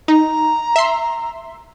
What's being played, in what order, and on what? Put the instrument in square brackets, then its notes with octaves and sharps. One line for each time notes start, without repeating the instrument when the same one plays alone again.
[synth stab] D#4 [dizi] A#5
[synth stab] E5 C6